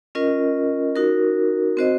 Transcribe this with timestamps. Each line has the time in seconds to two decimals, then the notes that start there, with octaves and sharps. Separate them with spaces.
0.15 C#4 F4 A#4 D#5
0.96 D#4 F#4 A#4
1.77 C4 F#4 C5 D#5